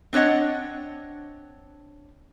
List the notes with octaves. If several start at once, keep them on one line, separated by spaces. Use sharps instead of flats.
C4 D4 C#5 D#5 F#5